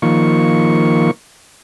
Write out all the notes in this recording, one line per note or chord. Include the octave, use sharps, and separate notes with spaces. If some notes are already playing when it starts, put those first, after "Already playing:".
D#3 F3 A#3 C#6